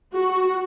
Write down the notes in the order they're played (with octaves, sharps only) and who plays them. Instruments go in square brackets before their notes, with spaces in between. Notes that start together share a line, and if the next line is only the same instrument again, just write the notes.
[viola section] F#4